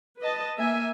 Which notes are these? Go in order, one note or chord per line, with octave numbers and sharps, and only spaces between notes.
B4 D#5 A5
A#3 E5 G#5